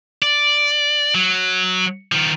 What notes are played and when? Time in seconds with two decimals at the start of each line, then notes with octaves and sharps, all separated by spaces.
0.22 D5
1.15 F#3
2.12 D#3 F3